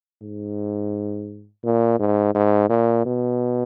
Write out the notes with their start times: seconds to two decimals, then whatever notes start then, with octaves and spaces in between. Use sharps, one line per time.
0.22 G#2
1.64 A#2
2.00 G#2
2.35 G#2
2.70 A#2
3.06 B2